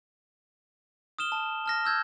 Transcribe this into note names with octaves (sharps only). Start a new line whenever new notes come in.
D#6 F6 E7 G7
A5
A5 F6 A#6
E6 F6 G6 G#6